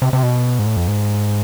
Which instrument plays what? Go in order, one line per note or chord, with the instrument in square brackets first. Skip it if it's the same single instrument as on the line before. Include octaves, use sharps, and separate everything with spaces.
[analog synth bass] C3
C3
B2
G#2
A2
F2
G#2